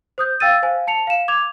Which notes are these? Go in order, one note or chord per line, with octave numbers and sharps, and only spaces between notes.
C5 D#6 G6
F5 G5 E6 A6 D#7
C5 F5 G#5
A5 C#7 F7
F5 E7
D6 G#6 F7